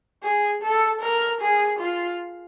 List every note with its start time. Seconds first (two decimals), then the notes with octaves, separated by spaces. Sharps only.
0.23 G#4
0.63 A4
1.02 A#4
1.41 G#4
1.80 F4